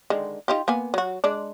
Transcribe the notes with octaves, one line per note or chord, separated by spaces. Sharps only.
D3 D#3 G#3
D#4 F4 G4
A#3 B3 G#5
F#3 F#4
G#3 D4 D5